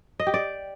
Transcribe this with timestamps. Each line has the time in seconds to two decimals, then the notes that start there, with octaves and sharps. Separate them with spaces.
0.20 D#5
0.27 G4
0.34 D5